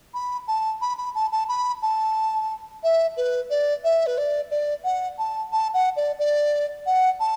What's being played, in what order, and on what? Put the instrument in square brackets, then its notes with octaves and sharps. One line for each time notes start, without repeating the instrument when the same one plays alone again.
[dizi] B5
A5
B5
B5
A5
A5
B5
A5
E5
B4
D5
E5
B4
D5
D5
F#5
A5
A5
F#5
D5
D5
F#5
A5